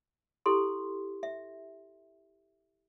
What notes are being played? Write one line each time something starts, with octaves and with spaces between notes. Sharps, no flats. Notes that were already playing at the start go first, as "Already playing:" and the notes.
E4 G4 A4 C6
E5